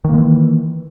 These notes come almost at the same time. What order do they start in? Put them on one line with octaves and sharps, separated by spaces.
D#3 A#3 G#3 E3